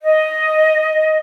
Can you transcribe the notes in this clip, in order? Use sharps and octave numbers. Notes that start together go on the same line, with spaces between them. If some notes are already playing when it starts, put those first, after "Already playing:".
D#5